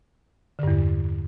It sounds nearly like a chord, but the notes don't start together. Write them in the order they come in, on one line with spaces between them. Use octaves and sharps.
D3 G2 E2